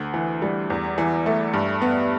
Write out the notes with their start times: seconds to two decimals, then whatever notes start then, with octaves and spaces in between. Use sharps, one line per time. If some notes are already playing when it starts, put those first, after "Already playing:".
Already playing: D2
0.14 E3
0.42 G3
0.70 E2
0.98 E3
1.26 A3
1.54 G2
1.82 B3